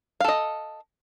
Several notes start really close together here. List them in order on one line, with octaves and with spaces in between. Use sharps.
F5 A4 D#5